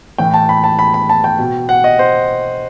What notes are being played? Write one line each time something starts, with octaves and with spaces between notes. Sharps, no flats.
A2 E3 G5
A5
B5
A5
B5
B5
A5
G5
B2
F#5
D#5
C5